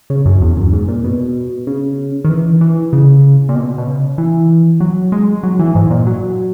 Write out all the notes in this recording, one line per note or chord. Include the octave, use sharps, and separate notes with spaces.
C#3
F#2
E2
F#2
G#2
A#2
B2
C#3
D#3
E3
E3
C#3
A#2
B2
B2
C#3
E3
F#3
G#3
F#3
E3
G#2
A#2
F#3